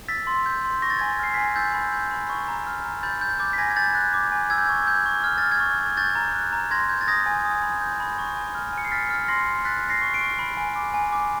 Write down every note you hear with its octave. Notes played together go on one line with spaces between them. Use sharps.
E6 A6 B6
C6
G6
C6
C#6 A#6
A6
G#5 G#6 A#6
F6 C7
G#5 B6
A#6
E6 G6 A6
B5
G6
B5
C#6
A#5
F6
A#5
B5 G6 A6
G6
D6 G6 A6
B6
G#5 G#6 A#6
G#6
B5 G6 A6
F#6
D6
G#5
E6 G#6
G6
C#6 G#6
G6
C#6
F6 G#6
F6 A6
G#6
C#6
C#6
C#6 G6 A6
A#5
F#6
A#5
C6 G#6 A#6
G6
A6
D#6 G#6 A#6
G#5
D#6
B5
G6
B5
C#6
G#5
F6
G#5 C#7
C7
F6 A6 B6
F6
C6 A#6 C7
C6
F#6 A6 B6
F#6
A#6 C7
C#6
C7 D7
C#6
B5
G#5
D6
G#5
D6